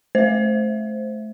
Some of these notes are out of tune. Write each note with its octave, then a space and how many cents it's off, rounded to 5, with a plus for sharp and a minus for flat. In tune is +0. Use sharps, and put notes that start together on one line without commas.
A3 -25 C5 +0 E5 -5